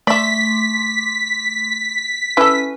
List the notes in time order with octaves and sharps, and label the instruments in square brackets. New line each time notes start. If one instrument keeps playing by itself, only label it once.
[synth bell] A3 C6 D6 [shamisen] D5 E5 [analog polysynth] B6
[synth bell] C#4 B4 [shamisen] E4 A4